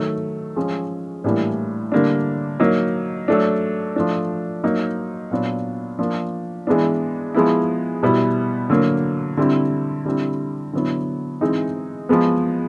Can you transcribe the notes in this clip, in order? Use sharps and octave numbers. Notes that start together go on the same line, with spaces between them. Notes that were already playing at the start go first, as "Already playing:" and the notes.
Already playing: D#3 F#3 A3
F3 G#3 C#4
A2 E3 G3 A#3 D4
D3 G3 A#3 D4
F#3 A#3 D#4
F#3 A3 D4
F3 A3 D4
F#3 A#3 D#4
A#2 F#3 B3 D4
F3 A#3 D4
E3 G#3 B3 D4
F3 G#3 B3 E4
B2 G3 B3 E4
D3 F#3 A#3
D3 G3 C4 E4
D3 G3 C4 E4
D3 F#3 B3 E4
E3 G#3 C4 D#4
F3 G#3 B3